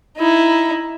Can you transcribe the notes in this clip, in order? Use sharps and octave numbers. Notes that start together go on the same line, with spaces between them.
D#4 E4